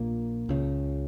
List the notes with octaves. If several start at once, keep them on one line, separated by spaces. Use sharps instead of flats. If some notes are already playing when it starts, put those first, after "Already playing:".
Already playing: A#1 A#2 A#3
C#2 C#3